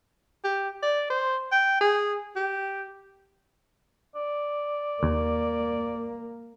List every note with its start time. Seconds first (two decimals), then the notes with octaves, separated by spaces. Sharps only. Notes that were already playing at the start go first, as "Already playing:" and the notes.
0.44 G4
0.83 D5
1.10 C5
1.52 G5
1.81 G#4
2.36 G4
4.15 D5
5.03 D#2 A#3